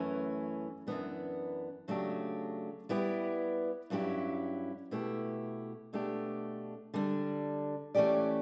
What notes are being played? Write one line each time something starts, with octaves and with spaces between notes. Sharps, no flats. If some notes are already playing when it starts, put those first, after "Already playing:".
Already playing: F#2 E3 A3 C#4
F#2 E3 B3 D4
C#3 F#3 A3 D4 G4
G3 B3 E4 G4
G2 F#3 C#4 E4 G4
B2 A3 E4 G4
B2 A3 D4 G4
D3 G3 B3 D4
E3 A3 C#4 G4 D5